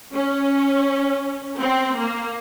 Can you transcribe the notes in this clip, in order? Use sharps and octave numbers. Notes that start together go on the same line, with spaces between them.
C#4
C4
A#3